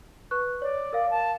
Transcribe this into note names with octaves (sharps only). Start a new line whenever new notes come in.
B4 C#6 F#6
C#5 D5
A#4 F5
A5